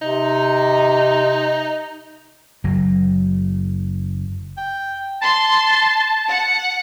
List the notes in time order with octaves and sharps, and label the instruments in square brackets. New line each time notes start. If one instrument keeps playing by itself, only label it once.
[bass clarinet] C3 [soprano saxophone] D#4
[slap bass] F#1 F#3
[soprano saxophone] G5
[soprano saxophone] A5 [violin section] C6
[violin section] F#5 C#7